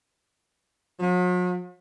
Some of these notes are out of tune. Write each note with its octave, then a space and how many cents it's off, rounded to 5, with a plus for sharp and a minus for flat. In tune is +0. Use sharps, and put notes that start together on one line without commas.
F#3 -45